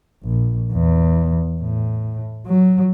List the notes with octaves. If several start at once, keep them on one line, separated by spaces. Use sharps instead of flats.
A#1
E2
A2
F#3